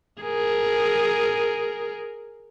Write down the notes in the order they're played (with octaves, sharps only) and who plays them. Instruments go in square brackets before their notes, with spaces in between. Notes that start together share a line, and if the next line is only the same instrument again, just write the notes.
[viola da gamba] G#4 A#4